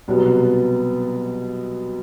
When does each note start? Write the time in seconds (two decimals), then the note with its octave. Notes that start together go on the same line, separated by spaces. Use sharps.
0.08 C2 B2 F#3 B3